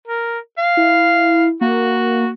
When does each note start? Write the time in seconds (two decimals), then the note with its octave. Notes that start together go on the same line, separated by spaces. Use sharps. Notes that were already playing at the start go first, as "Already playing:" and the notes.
0.08 A#4
0.58 F5
0.77 E4
1.61 A#3 F#4